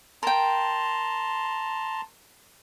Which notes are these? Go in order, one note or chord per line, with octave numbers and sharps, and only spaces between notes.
A#4 G5 A5 A#5 C6